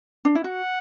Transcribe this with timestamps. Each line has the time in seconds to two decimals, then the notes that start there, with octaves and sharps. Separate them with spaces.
0.25 D4
0.35 E4
0.44 F#4 F#5